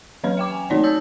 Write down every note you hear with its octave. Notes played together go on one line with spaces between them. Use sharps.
E3 F#3 C#4 B4 B5
E5 G5 D6
G#5
E3 A3 C4 D#4 C#5 D5
A5 D#6 E6 G6